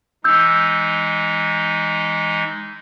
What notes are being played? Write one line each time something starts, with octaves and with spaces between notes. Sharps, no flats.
E3 G#3 D#4 E6 G6